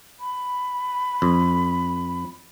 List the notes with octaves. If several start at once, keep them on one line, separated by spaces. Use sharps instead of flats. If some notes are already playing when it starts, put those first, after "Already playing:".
B5
F2